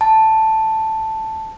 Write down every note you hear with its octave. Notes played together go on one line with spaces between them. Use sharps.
A5